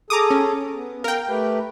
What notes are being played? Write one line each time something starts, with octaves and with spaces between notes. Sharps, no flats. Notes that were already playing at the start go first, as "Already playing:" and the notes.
G#4 A4 A#5 D6 D#6
C#4
B3
A#4 F5 G5
A3 G4 B4